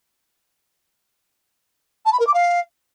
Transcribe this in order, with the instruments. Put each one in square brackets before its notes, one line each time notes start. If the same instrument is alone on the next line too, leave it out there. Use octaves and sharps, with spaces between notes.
[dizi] A5
B5
A#4
D6
F5